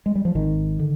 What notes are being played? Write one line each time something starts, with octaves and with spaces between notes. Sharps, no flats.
G#3
G3
F3
G#1 D#3
D3